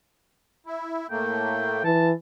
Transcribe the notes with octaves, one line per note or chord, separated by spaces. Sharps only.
E4
A2 A3 A#3 G5
E3 A5